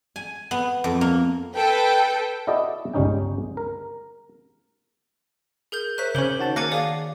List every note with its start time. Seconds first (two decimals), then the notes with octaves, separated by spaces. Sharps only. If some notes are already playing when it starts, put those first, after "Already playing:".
0.16 G#5
0.51 B3
0.84 F2
1.01 A#3
1.55 A4 B4 G5
2.47 E4 F#4 A4 D5 D#5
2.94 G1 C#2 G3 C#4 D#4 G5
3.57 A#4
5.72 G#4 A#4 G6
5.98 A#4 C5 C#5 E5 F#6 B6
6.15 C#3 C#4 C#5 D6 G6 F#7
6.39 D#3 F#4 A5
6.56 A#3 G#5 D6 F#6 A#6 C#7
6.72 G#4 D5 F5